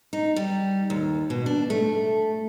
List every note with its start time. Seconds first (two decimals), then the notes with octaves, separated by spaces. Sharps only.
0.13 D#4
0.36 G3
0.90 D#2
1.30 B2
1.46 D4
1.70 A3